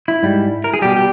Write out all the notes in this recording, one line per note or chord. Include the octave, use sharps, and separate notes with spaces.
E4
G#2 G3
A#4
G#4
B2 G3 G4
G4